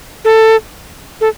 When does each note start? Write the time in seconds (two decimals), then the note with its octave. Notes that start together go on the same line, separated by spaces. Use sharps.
0.25 A4
1.21 A4